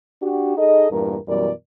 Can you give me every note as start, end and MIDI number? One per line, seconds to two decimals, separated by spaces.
0.22 0.55 62
0.22 0.55 66
0.22 0.55 67
0.57 0.88 63
0.57 0.88 68
0.57 0.88 69
0.57 0.88 75
0.91 1.17 40
0.91 1.17 43
0.91 1.17 46
0.91 1.17 70
1.28 1.50 42
1.28 1.50 47
1.28 1.50 52
1.28 1.50 55
1.28 1.50 70
1.28 1.50 74